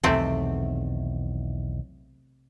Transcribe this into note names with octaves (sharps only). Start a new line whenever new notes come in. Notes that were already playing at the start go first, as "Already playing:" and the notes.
B1 E2 C3 D#3 A3 C4